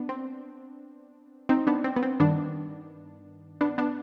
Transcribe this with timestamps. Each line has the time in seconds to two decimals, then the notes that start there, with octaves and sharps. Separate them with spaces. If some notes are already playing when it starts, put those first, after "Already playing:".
Already playing: B3 D4
0.09 C4
1.49 C4 D#4
1.67 B3 D4
1.84 C4
1.96 B3
2.03 C4
2.20 G2 D#3 B3 D4
3.61 B3 D4
3.78 B3 D4